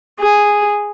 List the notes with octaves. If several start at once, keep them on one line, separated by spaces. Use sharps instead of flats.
G#4